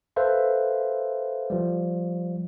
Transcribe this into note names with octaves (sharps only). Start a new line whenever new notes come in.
A4 B4 C5 E5 F5
F3 G3